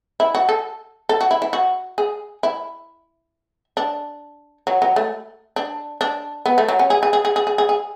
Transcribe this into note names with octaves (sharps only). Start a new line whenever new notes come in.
E4
F#4
A4
A4
F#4
E4
E4
F#4
G#4
E4
D4
F#3
F#3
A3
D4
D4
B3
A3
F#3
C#4
G#4
G#4
G#4
G#4
G#4
G#4
G#4
G#4